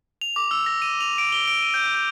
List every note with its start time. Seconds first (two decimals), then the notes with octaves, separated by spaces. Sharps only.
0.21 F7
0.36 D6
0.51 E6
0.66 A#6
0.82 D#7
1.01 F7
1.18 D7
1.32 G7
1.48 D7
1.63 D#7
1.74 G6
1.94 G6